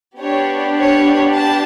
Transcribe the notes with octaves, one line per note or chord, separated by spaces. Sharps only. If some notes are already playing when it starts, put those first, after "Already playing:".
B3 D4 G4 C#5
C#5
A5